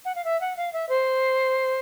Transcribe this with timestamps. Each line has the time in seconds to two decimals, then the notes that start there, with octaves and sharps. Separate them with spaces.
0.05 F#5
0.15 F5
0.25 E5
0.41 F#5
0.57 F5
0.73 E5
0.89 C5